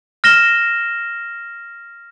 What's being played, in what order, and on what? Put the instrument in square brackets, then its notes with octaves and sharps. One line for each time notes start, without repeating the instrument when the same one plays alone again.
[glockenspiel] F6 A#6 E7 G7